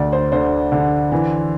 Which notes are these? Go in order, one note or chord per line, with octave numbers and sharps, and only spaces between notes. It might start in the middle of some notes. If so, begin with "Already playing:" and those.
Already playing: D2 D3 D5
C5
D3 C5
D3
E3